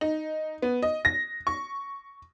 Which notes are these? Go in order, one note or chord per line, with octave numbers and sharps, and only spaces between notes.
D#4
B3
D#5
A#6
C#6